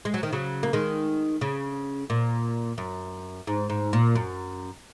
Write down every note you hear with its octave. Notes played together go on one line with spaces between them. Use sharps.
G#3
F#3
D#3
C#3 F#3
A#3
D#3 G#3
C#3
A#2
F#2
G#2
G#2
A#2
F#2